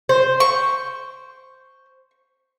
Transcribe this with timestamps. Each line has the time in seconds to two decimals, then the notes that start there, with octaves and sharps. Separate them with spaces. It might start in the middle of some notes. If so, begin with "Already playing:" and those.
0.09 C5
0.40 C#6